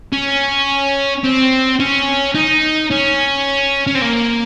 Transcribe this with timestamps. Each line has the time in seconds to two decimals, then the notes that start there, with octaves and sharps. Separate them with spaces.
0.13 C#4
1.24 C4
1.80 C#4
2.35 D#4
2.91 C#4
3.87 C#4
3.95 C4
4.02 A#3